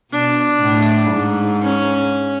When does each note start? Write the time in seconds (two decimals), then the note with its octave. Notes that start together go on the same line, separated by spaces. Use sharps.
0.12 B2 D4
0.62 A2
1.13 G#2
1.62 C#4